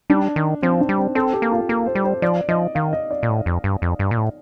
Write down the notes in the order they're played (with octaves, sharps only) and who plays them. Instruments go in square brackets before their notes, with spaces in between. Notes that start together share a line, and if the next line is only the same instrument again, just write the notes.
[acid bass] G3 [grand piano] D4
[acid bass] D#3
[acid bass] F3 [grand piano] C4
[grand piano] D4
[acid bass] G3
[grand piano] C4
[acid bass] C4 [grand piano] A4
[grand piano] G4
[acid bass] A#3
[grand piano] F4
[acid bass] A#3 [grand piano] A4
[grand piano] C5
[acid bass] G3
[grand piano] C5
[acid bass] F3 [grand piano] D5
[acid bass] F3 [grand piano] D#5
[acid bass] D#3 [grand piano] F5
[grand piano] D#5
D5
[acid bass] A#2
A2
F2
G2
F2
G2
A#2
A2